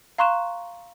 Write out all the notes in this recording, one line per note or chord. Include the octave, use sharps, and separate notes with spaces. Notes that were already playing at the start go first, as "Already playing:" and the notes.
F5 A#5 C6 C#6 F#6 E7